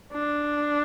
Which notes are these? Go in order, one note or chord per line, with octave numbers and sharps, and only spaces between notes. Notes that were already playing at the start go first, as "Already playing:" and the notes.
D4